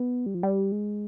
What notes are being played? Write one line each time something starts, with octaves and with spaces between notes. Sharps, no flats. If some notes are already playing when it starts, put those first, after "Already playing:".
Already playing: B3
G3
F3
G3
G#3